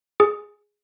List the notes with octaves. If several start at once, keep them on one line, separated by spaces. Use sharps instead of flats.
G#4